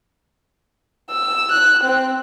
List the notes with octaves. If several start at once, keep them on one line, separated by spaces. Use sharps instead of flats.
E6
F#6
C4